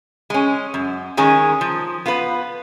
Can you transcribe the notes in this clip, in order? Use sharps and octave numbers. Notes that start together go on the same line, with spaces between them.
G#3 C#4
F#2
D#3 G#3 C#4 G#4
F3
B3 F4 B4